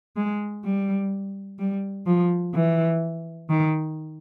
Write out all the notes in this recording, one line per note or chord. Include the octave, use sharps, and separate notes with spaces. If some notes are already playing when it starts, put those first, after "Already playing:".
G#3
G3
G3
F3
E3
D#3